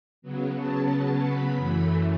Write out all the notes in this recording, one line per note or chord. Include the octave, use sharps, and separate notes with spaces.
C#3 F#3 B3
A5
B5
F#2 E3 A3 B5